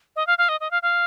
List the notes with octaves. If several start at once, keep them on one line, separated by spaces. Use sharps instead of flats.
D#5
F5
F5
D#5
D#5
F5
F5